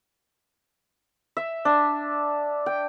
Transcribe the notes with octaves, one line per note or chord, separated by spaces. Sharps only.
E5
D4
G5